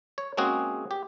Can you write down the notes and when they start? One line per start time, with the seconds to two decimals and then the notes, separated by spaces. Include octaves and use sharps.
0.18 C#5
0.37 G#3 A#3 C4 C#4 F#4 G#4
0.91 G4